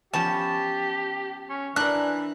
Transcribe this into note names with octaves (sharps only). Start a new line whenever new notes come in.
F3 B3 C#4 G4 A5
C#4
E3 D4 A#4 F#6